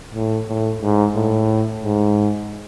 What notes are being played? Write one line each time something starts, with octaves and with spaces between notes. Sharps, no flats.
A2
A2
G#2
A2
G#2